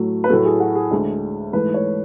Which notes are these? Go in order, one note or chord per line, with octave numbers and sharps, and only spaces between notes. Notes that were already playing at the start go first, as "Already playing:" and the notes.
Already playing: A2 F#3 A3
B4
A2 F#3 A3 A4
G#4
F#4
G#4
D2 D3 G#3
G#2 E3 A3 B4
C#5